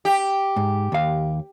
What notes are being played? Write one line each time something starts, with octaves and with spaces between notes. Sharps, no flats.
G4
G#2
D#2 F5